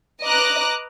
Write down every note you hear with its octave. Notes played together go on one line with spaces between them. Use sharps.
B4 D#5 A#5 D6 F#6 A#6